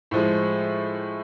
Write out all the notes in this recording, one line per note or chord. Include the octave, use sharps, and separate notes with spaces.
A2 F3 G#3